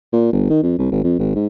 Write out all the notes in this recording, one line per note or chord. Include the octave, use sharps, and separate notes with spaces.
A#2
G1
D#3
F2
C2
G#1
F2
G#1
G#2